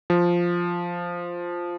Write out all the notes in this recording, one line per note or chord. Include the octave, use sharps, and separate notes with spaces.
F3